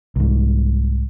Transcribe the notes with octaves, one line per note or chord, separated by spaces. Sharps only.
C2 G#2